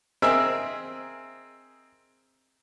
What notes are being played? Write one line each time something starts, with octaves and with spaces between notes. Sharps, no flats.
C4 G#4 A#4 D#5 E5